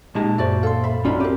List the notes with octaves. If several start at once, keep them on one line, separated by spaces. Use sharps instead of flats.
A#2 G#3 D#4 G4 A5
F#2 F#4 C5 D5 E5
A4 F5 C6
E5 B5
A1 C#4 D#4 F4 F#4 D5 B5
C4 G4 A#4